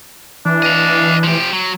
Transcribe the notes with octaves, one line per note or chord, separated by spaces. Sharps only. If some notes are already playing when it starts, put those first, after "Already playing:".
E3 D4
D#5 F5
F3 G4
F#3